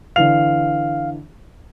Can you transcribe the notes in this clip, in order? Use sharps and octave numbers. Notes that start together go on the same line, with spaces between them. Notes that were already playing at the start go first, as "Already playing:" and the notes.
D3 E3 F5 F7